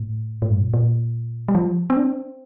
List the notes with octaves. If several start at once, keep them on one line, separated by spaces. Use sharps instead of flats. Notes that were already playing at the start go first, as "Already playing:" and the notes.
Already playing: A2
A2
G2
A#2
A#2
G3
F3
C4
D4
C4